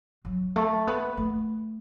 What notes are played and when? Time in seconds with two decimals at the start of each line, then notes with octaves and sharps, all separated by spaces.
0.25 F#3
0.56 A3
0.87 B3
1.17 A3